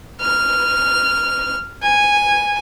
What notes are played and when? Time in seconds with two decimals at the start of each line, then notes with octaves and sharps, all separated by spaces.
0.21 F6
1.82 G#5